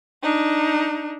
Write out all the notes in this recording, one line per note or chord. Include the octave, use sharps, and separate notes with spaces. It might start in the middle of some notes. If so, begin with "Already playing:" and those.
D4 D#4